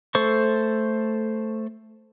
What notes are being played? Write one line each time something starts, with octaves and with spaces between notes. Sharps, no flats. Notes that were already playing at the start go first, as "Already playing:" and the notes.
A3 A4 C5 C#6